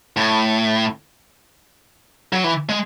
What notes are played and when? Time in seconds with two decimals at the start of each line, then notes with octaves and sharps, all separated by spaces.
0.17 A2
2.33 F#3
2.44 E3
2.69 G#3